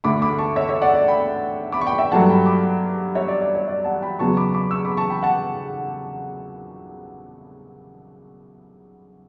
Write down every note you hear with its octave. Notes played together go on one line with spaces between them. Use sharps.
D2 D3 A3 B5 D6
B5 D6
A5 C#6
C#5 E5
C#5 E5
D5 F#5
D5
G5 B5
B5 D6
C#6
G5 B5
E5 G5
G2 F#3 A3 F#5 A5
G5 B5
B5 D6
C#5 E5
D5
D5
C#5
D5
F#5 A5
G5 B5
E2 C#3 F#3 B3 A5 C#6
B5 D6
B5 D6
C#6 E6
B5 D6
A5 C#6
G5 B5
F#5 A5